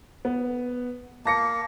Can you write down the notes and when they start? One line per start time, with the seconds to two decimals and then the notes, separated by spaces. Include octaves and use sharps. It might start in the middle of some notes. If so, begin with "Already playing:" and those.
0.25 B3
1.26 A#3 A5 A#6 C#7